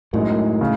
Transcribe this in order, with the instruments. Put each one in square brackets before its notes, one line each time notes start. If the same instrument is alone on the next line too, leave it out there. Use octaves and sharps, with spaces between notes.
[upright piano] F#2 D#3 G#3 [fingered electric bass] A2
[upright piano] C#3